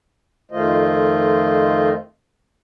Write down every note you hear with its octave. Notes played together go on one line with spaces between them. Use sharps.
F2 D#3 A3 F4 C5 D#5